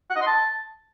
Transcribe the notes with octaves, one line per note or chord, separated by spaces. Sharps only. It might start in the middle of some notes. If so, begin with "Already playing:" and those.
F#5
D#5
C6
A5